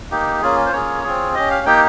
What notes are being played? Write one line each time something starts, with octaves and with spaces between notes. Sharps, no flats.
A#3 D#4 G4
A#3 C#4 F4 G#4
C5
A#3 C#4 F4 G#4 C#5
C4 F4 G#4
C#4 G4 D#5
F5
A#3 D#4 G4 G5